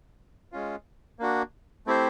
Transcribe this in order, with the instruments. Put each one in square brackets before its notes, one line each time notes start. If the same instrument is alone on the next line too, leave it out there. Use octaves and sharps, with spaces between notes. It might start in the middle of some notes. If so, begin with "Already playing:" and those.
[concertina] G#3 C#4 F4
A#3 D4 F#4
A3 C4 E4 G4 C5